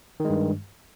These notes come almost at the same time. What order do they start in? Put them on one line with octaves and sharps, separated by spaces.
D#3 G#3 G2